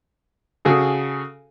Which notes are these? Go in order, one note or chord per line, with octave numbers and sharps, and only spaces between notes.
C#3 F#4 G#4 A4